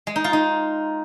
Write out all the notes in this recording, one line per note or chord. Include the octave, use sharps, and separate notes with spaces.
G#3
D#4
F4
D#4